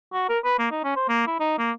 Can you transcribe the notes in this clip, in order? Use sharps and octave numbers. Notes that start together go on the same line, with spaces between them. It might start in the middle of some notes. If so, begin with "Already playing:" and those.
F#4
A#4
B4
A#3
D#4
C#4
C5
A#3
E4
D#4
A#3